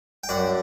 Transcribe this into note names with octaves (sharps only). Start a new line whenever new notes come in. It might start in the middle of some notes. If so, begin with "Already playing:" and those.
G5
F#2 D5 F#5